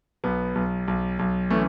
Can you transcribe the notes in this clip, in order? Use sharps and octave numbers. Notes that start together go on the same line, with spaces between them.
B1 B3
B1
B1
B1
E3 A3 C#4